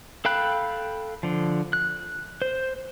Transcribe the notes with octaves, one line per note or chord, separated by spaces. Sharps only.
A4 F5 G5 B5 F#6
D3 F3
F#6
C5